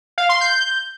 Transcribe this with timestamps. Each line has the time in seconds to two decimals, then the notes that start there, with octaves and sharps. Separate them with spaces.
0.18 F5
0.29 C6
0.41 G6